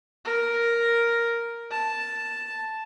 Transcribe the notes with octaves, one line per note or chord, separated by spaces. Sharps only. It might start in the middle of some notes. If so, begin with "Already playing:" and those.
A#4
A5